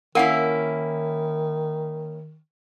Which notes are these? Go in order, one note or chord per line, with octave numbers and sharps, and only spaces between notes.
D#3 A#3 C#4 E4 A#4 F#5